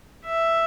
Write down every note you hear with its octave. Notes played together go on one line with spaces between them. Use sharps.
E5